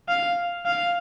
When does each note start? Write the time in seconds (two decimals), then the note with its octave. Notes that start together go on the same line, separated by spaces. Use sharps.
0.08 F5
0.66 F5